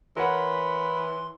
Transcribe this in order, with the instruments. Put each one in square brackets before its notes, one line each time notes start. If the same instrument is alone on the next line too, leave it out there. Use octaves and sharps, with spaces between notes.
[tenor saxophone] E3 [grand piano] A#4 C#5 F#5 [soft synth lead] B5 [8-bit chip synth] C6